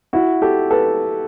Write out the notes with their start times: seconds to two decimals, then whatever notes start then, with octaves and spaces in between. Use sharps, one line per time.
0.13 E4 F#4
0.42 G4 A4
0.71 A4 B4